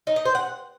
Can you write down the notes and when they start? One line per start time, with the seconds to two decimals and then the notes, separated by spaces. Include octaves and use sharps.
0.07 D#4
0.16 D#5
0.25 C5
0.35 F#5